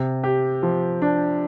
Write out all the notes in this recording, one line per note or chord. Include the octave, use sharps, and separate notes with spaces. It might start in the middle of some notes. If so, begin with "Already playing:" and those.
Already playing: C3
G4
F3
D4